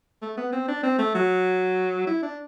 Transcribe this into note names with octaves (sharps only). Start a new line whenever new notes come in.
A3
B3
C4
D4
C4
A3
F#3
E4
D4